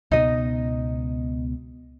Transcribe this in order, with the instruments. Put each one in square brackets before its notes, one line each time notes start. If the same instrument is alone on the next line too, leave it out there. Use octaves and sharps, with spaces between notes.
[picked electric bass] C#2 B2 B3 [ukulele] D#4 D#5